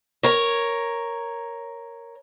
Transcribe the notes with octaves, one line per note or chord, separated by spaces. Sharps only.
A#4 C#5